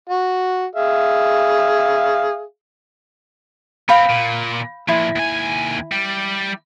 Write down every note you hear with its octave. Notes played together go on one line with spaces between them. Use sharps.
F#4
G#4 E5 F5
B3 C4 F5 G5 B5
A#2
A#2 F3 E4
D#2 G#5
G3